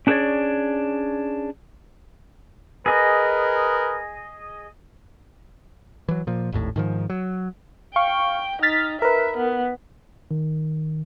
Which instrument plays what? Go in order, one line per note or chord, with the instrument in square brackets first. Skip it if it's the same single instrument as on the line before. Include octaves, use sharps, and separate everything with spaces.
[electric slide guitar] C#4 D4 G#4 B4 C#5 D5
[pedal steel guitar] G#4 D#5 [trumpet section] A#4 B4
[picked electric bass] E3 F#3
A#2 F3
G#1 D#2 A2
G#2 D#3 F3
F#3
[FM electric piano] F5 C#6 [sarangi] G5
[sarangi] D#4 [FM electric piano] F6 A6 B6
[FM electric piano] A#4 B4 [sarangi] E5
[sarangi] B3
[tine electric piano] D#3